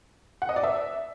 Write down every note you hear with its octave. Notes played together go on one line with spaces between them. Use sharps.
F#5
D#5
D5
E5